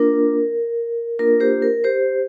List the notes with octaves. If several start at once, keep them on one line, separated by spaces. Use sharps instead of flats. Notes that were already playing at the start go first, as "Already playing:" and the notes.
Already playing: A#3 D4 F4 A#4
A#3 D4 F4 A#4
G4 C5
A#4
G4 C5